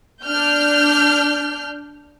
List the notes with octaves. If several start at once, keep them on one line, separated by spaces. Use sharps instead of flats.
D4 F6 G6